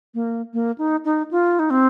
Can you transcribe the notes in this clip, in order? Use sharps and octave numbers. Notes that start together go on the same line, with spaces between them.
A#3
A#3
D#4
D#4
F4
D#4
C4